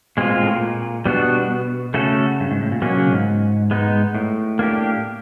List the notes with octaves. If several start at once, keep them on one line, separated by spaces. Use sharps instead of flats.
B2 G#3 C4 F4
A#2
A2
A#2
B2 G3 B3 D4 F#4
C#3 A3 C#4 F#4 A4
G2
G#2
A2
A#2
B2 F#3 A#3 C#4
C#3
G#2
G#3 B3 D#4
A2
A#3 D4 G4